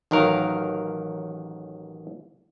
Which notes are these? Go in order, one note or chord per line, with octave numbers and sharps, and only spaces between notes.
A1 D#3 F#3 A#4 F5